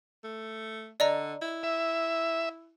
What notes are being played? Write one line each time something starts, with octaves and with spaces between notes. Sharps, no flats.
A3
D3 D5 D#5 A#5
E4
E5